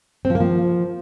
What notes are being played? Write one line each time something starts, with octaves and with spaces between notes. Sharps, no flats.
C4
F3
A#3
F3